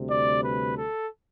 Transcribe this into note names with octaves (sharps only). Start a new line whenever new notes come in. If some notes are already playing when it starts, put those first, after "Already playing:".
Already playing: D2 C3 G3
D5
B4
A4